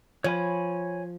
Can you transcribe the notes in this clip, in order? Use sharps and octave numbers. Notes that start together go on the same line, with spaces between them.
F3 C#5 G#5 B5